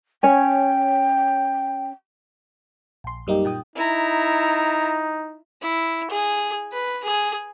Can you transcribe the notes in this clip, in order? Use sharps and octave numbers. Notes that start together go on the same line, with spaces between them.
C#4 C#5 G5 G#5
A#1 C6
F#2 G3 A#3 D#4 G4
A#2 G5 D#6
D#4 E4 A#5
E4
G#4
B4
G#4